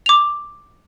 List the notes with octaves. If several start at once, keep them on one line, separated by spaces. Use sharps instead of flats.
D6 F7